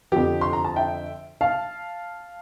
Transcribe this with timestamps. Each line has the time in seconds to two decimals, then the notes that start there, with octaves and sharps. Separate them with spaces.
0.12 F2 D3 F3 G4
0.41 C6
0.53 A#5
0.64 A5
0.76 E5 G5
1.41 F5 A5